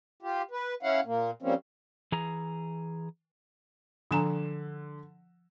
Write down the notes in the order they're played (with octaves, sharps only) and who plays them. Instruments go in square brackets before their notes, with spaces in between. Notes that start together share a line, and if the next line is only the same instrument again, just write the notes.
[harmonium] F4 G4
B4
C#4 E4 F5 F#5
A#2 A#3
F3 G3 A#3 C4 C#4
[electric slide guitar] E3 G#4 A#5
[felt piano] D3 E7 [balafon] F3 G#5 A#5